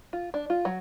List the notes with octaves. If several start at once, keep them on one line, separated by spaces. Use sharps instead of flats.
F4
D4
F4
F#3